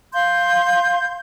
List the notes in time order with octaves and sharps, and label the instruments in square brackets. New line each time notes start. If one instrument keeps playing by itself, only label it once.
[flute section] F5 C6 G6